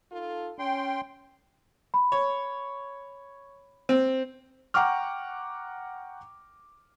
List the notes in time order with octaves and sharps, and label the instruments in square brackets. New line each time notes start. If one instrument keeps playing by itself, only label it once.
[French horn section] D#4 F4 A4
[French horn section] C#4 [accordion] G5 C6
[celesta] B5
[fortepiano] C#5
[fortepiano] C4 [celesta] C5
[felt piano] F#5 G5 A#5 C#6 D6 F6